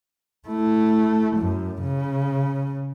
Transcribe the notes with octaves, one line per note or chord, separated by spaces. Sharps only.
A3 E4
F#2
C#3